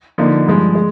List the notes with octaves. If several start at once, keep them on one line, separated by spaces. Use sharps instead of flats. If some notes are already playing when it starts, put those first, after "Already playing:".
D3 F3 A#3 D#4
G2 F3 G#3
G#3